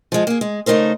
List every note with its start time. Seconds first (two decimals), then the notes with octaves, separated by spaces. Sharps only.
0.12 F3 G#3
0.27 A#3 G#4
0.41 G#3
0.66 C#3 A3 D#4 A#4 C5